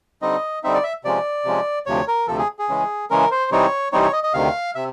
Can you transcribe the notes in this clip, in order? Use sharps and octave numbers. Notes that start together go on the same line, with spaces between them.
D3 G3 C4 D#4 D#5
D3 G3 C4 D#4 E5
D5
E5
C3 F3 G#3 C#4 D5
C3 F3 G#3 C#4
D2 C3 F3 C#5
A#4
D2 C3 F3 A4
G#4
G#4
C#3 E3 G#3 C#4
C#3 E3 G#3 C#4 A#4
C5
C3 E3 G3 C4 D#4 C#5
C3 E3 G3 C4 D#4 C#5
C#5
D#5
D#5
D2 C3 D#3 F5
C3 E5